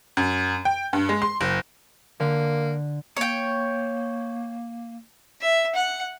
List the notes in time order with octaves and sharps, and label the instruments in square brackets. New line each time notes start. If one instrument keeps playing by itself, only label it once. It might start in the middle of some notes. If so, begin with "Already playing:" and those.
[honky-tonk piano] F#2
G5
G2
G#3
C6
F#1
[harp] D3 [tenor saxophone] A#3
[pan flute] A#3 [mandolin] C#5 G5
[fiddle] E5
F#5